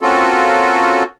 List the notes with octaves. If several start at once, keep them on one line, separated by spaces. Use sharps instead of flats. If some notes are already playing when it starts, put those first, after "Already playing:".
A#3 C4 C#4 F4 F#4 A4